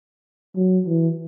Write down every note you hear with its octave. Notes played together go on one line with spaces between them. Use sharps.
F#3
E3